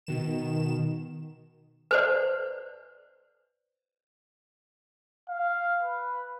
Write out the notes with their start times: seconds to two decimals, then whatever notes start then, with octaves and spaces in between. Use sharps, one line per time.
0.07 B2 D#3 E7
1.91 B4 C5 D5
5.29 F5
5.83 B4